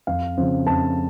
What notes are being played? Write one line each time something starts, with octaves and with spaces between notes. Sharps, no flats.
F2 F5
C#3 F3 C4
F2 A5